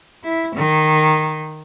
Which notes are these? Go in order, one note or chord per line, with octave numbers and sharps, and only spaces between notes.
E4
D#3